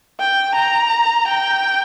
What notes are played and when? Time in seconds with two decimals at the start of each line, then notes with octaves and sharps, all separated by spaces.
0.20 G5
0.55 A#5
1.28 G5